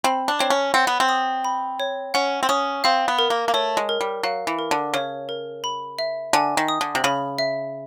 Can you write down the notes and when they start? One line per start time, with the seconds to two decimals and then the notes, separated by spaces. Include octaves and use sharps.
0.04 C4 B5
0.28 D4
0.39 C4 C#5
0.50 C#4
0.74 C4 F#5
0.87 B3
1.00 C4
1.09 D#6
1.45 B5
1.80 C#5
2.14 C#4 F#5
2.43 C4
2.49 C#4 D#6
2.84 C4 F5
3.08 B3
3.19 A#4
3.30 A#3
3.48 A#3
3.54 A3 C#5
3.77 G#3
3.89 A#4
4.01 G3
4.23 F#3 F5
4.47 E3
4.59 A#4
4.71 D3
4.94 C#3 C#5
5.29 A#4
5.64 B5
5.99 E5
6.33 D3 G#5
6.57 D#3
6.69 D#6
6.81 D3
6.95 C3
7.04 C#3 B5
7.38 E5